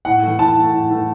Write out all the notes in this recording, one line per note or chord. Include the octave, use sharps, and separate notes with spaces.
A2 F#5
E3 A3
A2 A5
E3 A3
A2
E3 A3